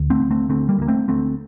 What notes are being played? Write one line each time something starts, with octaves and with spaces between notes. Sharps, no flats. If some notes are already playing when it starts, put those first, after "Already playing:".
Already playing: D2
A3 C4
D3
A3 C4
D2 A3 C4
G3 A#3
D2 A#3
A3 C4
D2 A3 C4